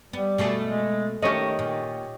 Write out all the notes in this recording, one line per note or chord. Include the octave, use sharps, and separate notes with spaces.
G3 B3
B2 A3 G#4
G#3
D#3 A3 C#4 G4 C#5 D#5
A#2